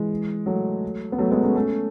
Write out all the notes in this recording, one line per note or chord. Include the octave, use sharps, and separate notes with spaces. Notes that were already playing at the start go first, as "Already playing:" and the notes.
Already playing: E3 G#3
F#3 A3
B3
F#3 A3
G#3 B3
A3 C#4
A3 C#4